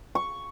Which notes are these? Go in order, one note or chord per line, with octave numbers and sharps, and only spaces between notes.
C#6